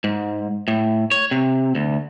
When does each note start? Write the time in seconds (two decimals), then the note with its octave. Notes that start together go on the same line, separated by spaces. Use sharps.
0.04 G#2
0.68 A2
1.11 C#5
1.31 C3
1.75 D2